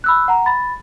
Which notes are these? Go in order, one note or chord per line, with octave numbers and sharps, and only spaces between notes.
B5 E6 F#6
F#5 A#5
B5 A6